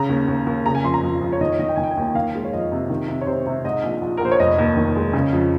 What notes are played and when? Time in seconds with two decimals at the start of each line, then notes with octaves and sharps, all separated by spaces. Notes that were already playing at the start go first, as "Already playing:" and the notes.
Already playing: C#3 A#5
0.09 D#2
0.28 D#2
0.47 D#2
0.66 C#3 A#5
0.75 G#5
0.84 F2 C6
0.94 A#5
1.03 F2
1.21 F2
1.32 C#5
1.41 D#3 D#5
1.49 C#5
1.59 D#3 D#5
1.69 G5
1.76 D#3 G#5
1.84 G5
1.91 G#5
1.97 D#2 G5
2.15 D#3 F5
2.34 G#3
2.44 C#5
2.53 F2 D#5
2.72 C3
2.90 D#3
3.08 C3
3.21 C#5
3.27 C3 C5
3.46 C3
3.64 G#2 D#5
3.83 A#1
4.02 A#1
4.17 A#4
4.21 A#1 C5
4.31 C#5
4.39 F1 D#5
4.58 D#2
4.77 D#3
4.95 G#3
5.13 C#3
5.32 F2